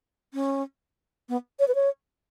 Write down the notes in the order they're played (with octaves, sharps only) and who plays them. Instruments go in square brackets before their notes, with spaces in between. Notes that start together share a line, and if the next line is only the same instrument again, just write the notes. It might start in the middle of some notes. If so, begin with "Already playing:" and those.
[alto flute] C#4
B3
C#5
B4
C#5